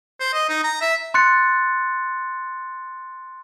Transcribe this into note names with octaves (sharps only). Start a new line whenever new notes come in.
C5
D#5
D#4
A#5
E5
C6 F#6 A6 C#7